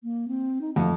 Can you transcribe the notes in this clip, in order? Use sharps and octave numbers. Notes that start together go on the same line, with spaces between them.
A#3
C4
D#4
F2 A3